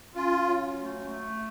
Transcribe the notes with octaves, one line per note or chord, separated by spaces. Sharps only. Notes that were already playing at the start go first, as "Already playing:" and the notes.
C#4 F4
F#3
A3
A3